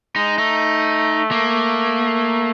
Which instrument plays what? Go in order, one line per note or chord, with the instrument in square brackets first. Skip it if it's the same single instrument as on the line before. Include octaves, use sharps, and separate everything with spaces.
[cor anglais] G#3 [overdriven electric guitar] D#4
[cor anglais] A3 [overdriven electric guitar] D#4
[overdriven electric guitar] A#3